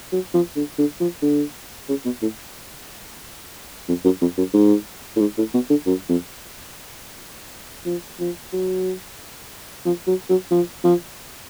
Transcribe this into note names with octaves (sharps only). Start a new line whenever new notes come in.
F#3
F3
D3
D3
F3
D3
C#3
B2
A2
F2
F#2
F2
F#2
G#2
A2
G#2
A2
B2
D3
F#2
F2
F3
F3
F#3
F3
F#3
F#3
F3
F3